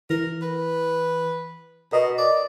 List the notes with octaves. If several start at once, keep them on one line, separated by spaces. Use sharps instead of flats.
E3 A#4
B4
B2 A#4 D#5
D5